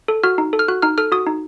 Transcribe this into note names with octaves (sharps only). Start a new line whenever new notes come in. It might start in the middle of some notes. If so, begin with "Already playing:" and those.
A4
F#4 F6
D#4
A4
F6
F#4 F#6
D#4 F6
A4 F6
F#4 D#6
D#4